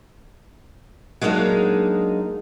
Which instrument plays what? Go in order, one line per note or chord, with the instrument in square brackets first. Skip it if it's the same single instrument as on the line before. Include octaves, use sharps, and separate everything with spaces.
[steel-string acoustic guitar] F#3 G#3 A#3 D4 D#4